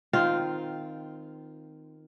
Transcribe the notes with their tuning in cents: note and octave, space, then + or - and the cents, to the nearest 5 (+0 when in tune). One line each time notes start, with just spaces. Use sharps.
D#3 +0 C4 -20 F4 +0